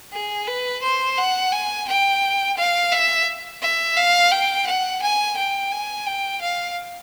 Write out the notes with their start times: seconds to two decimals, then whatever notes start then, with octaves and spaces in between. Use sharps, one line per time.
0.13 G#4
0.47 B4
0.83 C5
1.18 F#5
1.52 G#5
1.88 G5
2.57 F5
2.92 E5
3.62 E5
3.97 F5
4.32 G5
4.67 F#5
5.02 G#5
5.37 G5
5.72 G#5
6.06 G5
6.42 F5